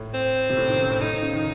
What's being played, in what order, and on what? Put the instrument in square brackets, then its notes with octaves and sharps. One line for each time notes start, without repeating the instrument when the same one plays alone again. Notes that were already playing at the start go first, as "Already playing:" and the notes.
Already playing: [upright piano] A2
[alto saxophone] C4
[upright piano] C3
A2
D#3
C#3
A2
[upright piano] A2 [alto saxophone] D#4
[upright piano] C#3
D#3